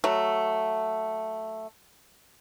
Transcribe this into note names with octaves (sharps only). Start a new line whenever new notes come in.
F#3 A3